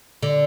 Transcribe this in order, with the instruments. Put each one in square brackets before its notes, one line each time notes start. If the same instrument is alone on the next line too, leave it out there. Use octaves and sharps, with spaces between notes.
[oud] D3